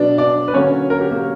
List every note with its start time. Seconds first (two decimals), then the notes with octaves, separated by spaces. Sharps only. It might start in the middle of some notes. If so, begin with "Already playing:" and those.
Already playing: B2 F#3 B3 D4 D5
0.18 D4 D5
0.48 B4
0.54 D3 F#3 A#3 C#4 C#5
0.90 A#4
1.01 G4
1.11 A#3 A#4